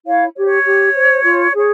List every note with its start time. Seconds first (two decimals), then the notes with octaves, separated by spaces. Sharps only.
0.06 E4 C#5 F5
0.35 G4 C#5
0.46 C#5
0.65 G4
0.95 C5
1.24 F4
1.53 G#4 C#5